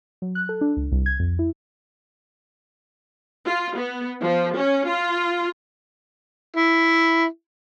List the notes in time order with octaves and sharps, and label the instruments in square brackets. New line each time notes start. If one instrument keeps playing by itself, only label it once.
[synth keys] F#3
F#6
A4
D4
C#2
C2
G#6
F2
E4
[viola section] F4
B3
F3
C#4
F4
[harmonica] E4